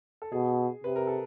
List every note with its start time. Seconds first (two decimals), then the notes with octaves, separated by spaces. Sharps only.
0.22 A4
0.32 B2 G#4
0.84 C3 B4
0.96 A#4
1.07 A4